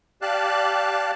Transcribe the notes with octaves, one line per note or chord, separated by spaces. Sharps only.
G4 D5 F5 A5 F#6